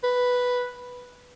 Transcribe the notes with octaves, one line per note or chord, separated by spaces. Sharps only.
B4